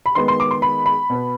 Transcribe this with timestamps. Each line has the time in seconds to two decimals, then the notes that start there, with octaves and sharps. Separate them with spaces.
0.06 B5
0.15 D#3 G#3 B3 C6
0.28 C6
0.40 D6
0.51 C6
0.62 B5
0.86 B5
1.10 B2 B3